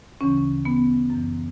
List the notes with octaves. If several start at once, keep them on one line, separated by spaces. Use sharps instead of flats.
D2 C#3 E3 C#4
B3
F#2
E3